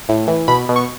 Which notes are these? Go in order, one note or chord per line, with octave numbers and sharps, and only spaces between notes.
A2
E3
B2 B5
B2
C#6